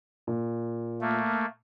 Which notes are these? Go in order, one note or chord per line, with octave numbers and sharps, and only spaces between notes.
A#2
A3 A#3